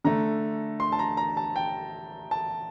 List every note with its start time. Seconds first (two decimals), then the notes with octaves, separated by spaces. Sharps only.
0.04 D3 A3 A#5
0.80 C6
0.92 A5
0.99 A#5
1.17 A#5
1.37 A5
1.56 G5
2.31 A5